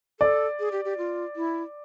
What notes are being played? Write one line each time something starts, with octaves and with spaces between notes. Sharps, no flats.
A4 D5
G#4
G4
G4
F4
E4